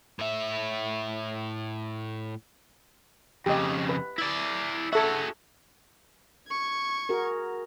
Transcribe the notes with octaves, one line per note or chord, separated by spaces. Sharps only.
A2 E5
F2 C#3 G4 D#5
B4
E4 D5
F#4 G#4 A4 E5
C#6 G#6
F#4 G#4 A#4